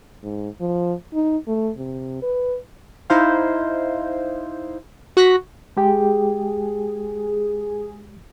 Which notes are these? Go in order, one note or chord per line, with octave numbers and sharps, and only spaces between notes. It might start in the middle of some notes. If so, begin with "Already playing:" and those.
G#2
F3
D#4
A3
C3
B4
D#4 E4 C5 F5
F#4 F#6 A#6 B6
G#3 G4 G#4 G5